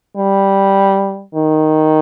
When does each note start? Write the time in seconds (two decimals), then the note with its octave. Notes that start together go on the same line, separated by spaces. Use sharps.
0.17 G3
1.35 D#3